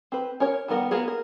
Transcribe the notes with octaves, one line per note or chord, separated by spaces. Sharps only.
C4 B4
C#4 A#4 C#5
D#3 G3 B3 A#4 F#5
A#3 B3 F#4 G#4
A#4